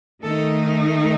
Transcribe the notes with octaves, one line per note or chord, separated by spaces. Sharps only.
D#3 A3 D#4 A4